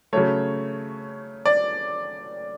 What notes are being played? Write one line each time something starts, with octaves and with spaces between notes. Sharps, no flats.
C#3 F#3 A3 C#5
D5